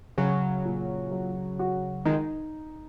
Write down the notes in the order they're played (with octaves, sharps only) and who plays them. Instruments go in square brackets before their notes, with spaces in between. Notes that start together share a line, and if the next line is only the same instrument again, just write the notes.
[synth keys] C#3 F#3 [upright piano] C#4
[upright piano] A#2
F#3
F#4
[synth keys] D#3 G#3 [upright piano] D#4